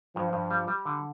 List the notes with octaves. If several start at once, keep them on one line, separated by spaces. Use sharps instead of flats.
G2 F3
G2
G3
G3
D3